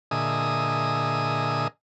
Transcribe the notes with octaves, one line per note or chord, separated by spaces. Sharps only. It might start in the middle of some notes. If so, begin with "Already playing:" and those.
A#2 D3 G#4 D#5 E5 D#6